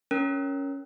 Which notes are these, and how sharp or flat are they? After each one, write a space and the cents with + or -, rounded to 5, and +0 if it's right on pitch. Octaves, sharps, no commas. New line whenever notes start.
C#4 +5 A#4 +0